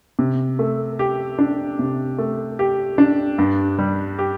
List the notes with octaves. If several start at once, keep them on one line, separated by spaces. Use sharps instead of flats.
C3
A3
G4
D4
C3
A3
G4
D4
G2
G3
G4